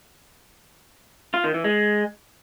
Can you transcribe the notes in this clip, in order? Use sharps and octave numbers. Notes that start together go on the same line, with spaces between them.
F4
D#3
E3
G#3